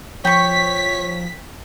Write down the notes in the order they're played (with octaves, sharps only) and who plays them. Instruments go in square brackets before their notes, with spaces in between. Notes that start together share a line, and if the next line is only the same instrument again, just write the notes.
[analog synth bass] F3 [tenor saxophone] C#5 [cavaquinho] G5 C#6 [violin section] B6